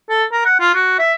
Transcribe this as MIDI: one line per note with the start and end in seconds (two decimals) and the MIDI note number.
0.09 0.24 69
0.32 0.42 70
0.45 0.58 78
0.60 0.70 65
0.74 0.95 66
0.99 1.13 76